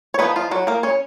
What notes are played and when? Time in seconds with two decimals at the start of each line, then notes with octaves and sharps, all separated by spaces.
0.14 C#5
0.19 F3 G#3 B3 D#4 B4
0.36 F4
0.51 F#3 F#4
0.67 A#3 A#4
0.83 C#4 C#5